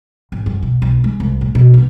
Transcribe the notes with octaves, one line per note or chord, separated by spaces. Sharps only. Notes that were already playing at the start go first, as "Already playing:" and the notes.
G#1
F#2
B2
B1
G#3
C2
A2
B2
A#1